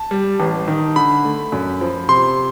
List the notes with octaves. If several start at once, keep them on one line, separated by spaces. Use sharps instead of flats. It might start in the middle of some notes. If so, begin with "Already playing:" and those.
Already playing: A5
G3
A1
D#3
D3 B5
A3
F#2
F3
C3 C6